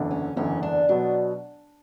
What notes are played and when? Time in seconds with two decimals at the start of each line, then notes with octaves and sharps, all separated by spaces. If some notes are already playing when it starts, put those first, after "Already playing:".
Already playing: F#1 E2 D3
0.11 C#4
0.36 F#1 E2 D3 C#4
0.63 D4
0.89 B2 F#3 B3 D4